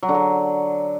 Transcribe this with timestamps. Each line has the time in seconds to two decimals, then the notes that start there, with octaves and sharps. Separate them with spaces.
0.03 F#3
0.09 D3
0.15 F#3